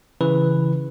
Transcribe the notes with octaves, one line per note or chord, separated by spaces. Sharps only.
C#3 E3 B4